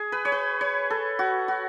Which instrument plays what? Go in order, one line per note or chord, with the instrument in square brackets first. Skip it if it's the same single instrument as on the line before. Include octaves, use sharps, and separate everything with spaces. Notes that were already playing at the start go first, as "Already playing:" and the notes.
Already playing: [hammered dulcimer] G#4
B4
C#5
B4
C#5
A4
F#4
F#4